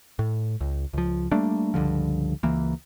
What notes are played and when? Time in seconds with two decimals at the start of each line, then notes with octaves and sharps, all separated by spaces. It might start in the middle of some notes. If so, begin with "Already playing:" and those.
0.19 A2
0.61 C#2
0.93 C#2 F3
1.31 G3 A3 A#3 D4
1.74 C#2 G2 D3 F3
2.43 C#2 E3 A#3